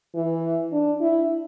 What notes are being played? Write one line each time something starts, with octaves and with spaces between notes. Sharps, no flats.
E3
D4
E4